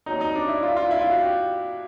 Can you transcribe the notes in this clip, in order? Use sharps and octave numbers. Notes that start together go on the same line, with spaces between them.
D#2 D#3 F#3 D#4
D#4
D4
E4
F4
F4
E4
F4
F#4
G4